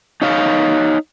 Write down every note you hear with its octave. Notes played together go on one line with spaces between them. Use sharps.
D#4 C#5 F5